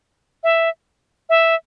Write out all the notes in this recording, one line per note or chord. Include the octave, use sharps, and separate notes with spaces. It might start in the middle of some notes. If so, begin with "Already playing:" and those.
E5
E5